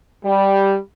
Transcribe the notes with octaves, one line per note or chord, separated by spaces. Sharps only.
G3